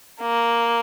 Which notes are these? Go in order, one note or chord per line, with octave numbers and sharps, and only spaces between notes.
A#3